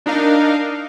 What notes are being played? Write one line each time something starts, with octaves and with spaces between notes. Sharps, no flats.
D4 D#4 A#4 F5